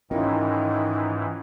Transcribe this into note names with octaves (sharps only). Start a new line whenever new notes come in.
G#2 D#3 E3 C#4 E4 F4